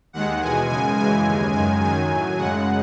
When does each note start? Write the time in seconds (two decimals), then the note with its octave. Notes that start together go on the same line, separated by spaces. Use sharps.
0.13 D#2 D#3 G#3 F#5
0.41 E2 B2 G#3 G#5
0.69 F#2 C#3 G#3 G#5
0.97 F#2 C#3 E3 G#3 G#5
1.25 D#2 C#3 G#3
1.53 F#2 D#3 G#3 G#5
1.81 F#2 D#3 F#3 G#5
2.10 A2 F#3
2.37 F#2 C#3 G#3 F#5